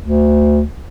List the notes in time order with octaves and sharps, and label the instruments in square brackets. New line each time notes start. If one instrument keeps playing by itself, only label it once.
[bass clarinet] D2